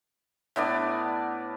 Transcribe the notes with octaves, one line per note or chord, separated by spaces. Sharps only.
A2 B3 D4 D5